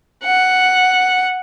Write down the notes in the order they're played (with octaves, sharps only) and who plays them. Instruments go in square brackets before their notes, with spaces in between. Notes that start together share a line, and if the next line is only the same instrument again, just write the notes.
[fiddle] F#5